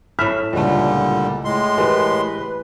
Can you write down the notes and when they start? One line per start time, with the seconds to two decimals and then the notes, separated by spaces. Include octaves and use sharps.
0.19 A2 E5 B5 F6
0.53 C#2 A#2 D3 E3 G3 A3
1.45 A2 G#3 C6
1.78 E3 A3 G4 G#4 A#4 B4